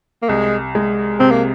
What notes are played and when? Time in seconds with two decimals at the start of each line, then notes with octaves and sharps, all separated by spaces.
0.22 A#3
0.29 C2 G#3
0.75 G#3
1.20 C3 C4
1.31 A#3